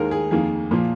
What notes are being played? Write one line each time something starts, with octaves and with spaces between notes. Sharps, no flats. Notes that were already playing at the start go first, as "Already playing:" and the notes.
Already playing: D#2 D#3 G#3 A#4
G#4
F2 D#3 A#3 G#4
A#2 F3 A#3